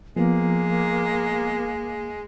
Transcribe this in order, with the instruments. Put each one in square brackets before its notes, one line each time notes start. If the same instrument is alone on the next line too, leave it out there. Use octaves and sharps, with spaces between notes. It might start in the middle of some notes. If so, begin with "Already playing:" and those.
[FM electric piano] F3 B3 [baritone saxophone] G#3 [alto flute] A#3